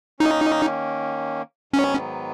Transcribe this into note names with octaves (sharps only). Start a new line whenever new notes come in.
D#3 A#3 C#4 D#4
G#2 D#3 F#3 B3 C#4